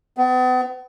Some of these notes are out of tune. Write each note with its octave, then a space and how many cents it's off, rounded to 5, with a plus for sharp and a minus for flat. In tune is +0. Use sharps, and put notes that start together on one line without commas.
B3 +40